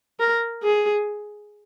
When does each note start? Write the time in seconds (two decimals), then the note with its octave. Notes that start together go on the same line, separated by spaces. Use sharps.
0.20 A#4
0.63 G#4